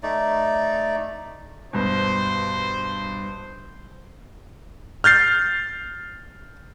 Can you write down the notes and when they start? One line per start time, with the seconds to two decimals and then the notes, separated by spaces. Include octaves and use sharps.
0.03 A3 D#4 D5
1.73 G2 B2 C5
5.04 F6 G6 A6 C7